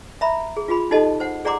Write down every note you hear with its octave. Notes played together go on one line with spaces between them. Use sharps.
E5 A#5 B5
G#4
F4 F#4 G#4 B5
D#4 F#4 G4 A4 D#5 A5
C5 F#5
G#4 D5 F#5 A#5 C6 D6